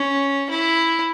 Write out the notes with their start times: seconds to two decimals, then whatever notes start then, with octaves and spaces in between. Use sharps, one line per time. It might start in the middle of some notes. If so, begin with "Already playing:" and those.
Already playing: C#4
0.50 E4